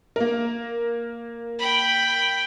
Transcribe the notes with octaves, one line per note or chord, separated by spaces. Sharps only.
A#3 A#4
G5 B5